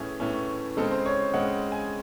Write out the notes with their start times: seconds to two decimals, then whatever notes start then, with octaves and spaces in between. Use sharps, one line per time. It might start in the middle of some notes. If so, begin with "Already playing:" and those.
Already playing: A2 E3 A3 C#4 G#4
0.20 A2 E3 A3 C#4
0.77 C#3 G#3 C4 A4
0.91 C5
1.06 C#5
1.34 C#3 G#3 C4 F#5
1.72 G#5